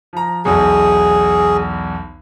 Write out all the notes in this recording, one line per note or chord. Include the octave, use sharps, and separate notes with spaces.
F3 A#5
B1 E2 G#4